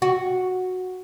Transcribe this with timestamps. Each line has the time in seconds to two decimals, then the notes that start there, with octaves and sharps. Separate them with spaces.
0.02 F#4